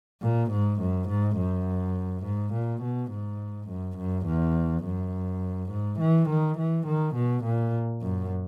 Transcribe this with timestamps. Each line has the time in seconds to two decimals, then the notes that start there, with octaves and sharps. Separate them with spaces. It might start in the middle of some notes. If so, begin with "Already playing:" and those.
0.22 A#2
0.51 G#2
0.80 F#2
1.09 G#2
1.38 F#2
2.24 G#2
2.53 A#2
2.82 B2
3.11 G#2
3.69 F#2
3.97 F#2
4.26 E2
4.84 F#2
5.71 G#2
5.99 E3
6.29 D#3
6.58 E3
6.87 D#3
7.16 B2
7.44 A#2
8.02 F#2